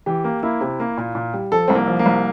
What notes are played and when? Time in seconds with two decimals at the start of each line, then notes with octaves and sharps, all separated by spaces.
0.06 E3 G4
0.24 A#3
0.43 A#3 E4
0.61 C3
0.80 A#3
0.97 A#2
1.15 A#2
1.33 G3
1.52 F3 A4
1.68 C2 C4
1.75 A#3
1.87 F3
1.99 A#3
2.06 C2